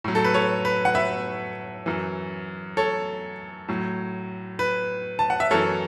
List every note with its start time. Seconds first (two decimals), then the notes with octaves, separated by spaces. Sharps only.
0.04 A2 F#3
0.15 A4
0.24 B4
0.34 A4 C#5
0.65 B4
0.85 F#5
0.95 B4 E5
1.86 F#2 E3
2.77 A4 C#5
3.69 A2 F#3
4.59 B4
5.19 A5
5.30 F#5
5.40 E5
5.51 F#2 E3 A4 C#5